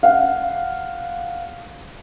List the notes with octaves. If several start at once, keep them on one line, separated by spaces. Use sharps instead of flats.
F5 F#5